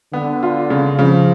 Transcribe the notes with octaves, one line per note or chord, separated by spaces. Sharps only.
D3 B3
F4
C#3
C#3 F3